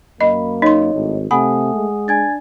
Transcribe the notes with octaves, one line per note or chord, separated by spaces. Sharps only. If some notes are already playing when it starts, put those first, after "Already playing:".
F#2 A#3 D#5 B5
D#4 C#5 D#5 C6
G#1 A2
C3 A3 F#5 G#5 B5 D#6
G#3
D4 G#5 G#6 A6